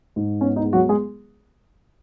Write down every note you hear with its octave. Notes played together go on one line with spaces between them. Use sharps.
G#2
B3 C#4
D#4
G#3
F#3 F#4
G#3 G#4